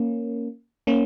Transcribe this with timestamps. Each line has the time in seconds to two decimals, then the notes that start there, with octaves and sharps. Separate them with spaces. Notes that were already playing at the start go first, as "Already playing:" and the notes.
Already playing: A#3 C#4
0.87 A#3 C#4